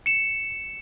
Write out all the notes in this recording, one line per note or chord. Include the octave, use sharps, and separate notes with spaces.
C#7 E7